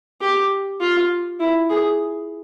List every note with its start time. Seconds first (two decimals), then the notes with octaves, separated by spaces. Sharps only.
0.21 G4
0.80 F4
1.40 E4
1.69 G#4